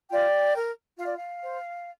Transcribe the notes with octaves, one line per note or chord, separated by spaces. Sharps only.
F4 D5 G5
A#4
F4 F5
D5
F5
C5